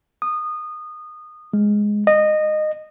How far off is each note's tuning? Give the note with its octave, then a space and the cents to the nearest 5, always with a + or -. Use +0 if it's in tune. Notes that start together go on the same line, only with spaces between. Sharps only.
D#6 -20
G#3 +0
D#5 -20